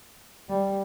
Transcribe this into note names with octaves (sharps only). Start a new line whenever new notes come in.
G3